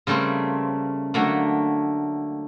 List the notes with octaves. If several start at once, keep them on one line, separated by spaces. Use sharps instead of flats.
C#3 G3 A3 A#3 C4
D3 F#3 A3 A#3